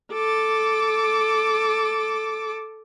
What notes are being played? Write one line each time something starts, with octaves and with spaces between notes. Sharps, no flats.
A4 D6